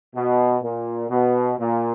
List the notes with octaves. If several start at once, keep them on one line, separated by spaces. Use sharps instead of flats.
B2
A#2
B2
A#2